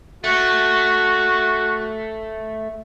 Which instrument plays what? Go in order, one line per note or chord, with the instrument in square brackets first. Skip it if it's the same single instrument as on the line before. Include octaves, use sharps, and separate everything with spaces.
[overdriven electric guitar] A3 [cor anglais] F#4